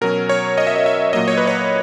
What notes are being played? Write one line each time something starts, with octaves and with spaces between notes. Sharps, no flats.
B2 F#3 C#4 A#4
C#5
D#5
E5
D#5
E5
A#2 F#3 A#3 D#5
C#5
B4
C#5